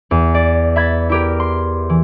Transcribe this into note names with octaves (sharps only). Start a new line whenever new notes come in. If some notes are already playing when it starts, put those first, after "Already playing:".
E2
D5
E5 B5 G#6 A6
E4 G4 A#4
C6
E3